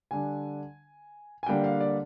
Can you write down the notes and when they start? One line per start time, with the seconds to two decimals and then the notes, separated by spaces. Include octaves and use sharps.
0.11 D3 G3 D4 G#5
1.43 G#5
1.46 D3 G3 A#3 D4 G5
1.64 F5
1.81 D5